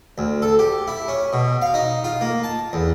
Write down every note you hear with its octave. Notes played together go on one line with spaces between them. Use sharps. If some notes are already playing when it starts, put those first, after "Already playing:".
D2
A4
G4
E4
C#4
B2
F5
D#4
F4
A#3
A5
E2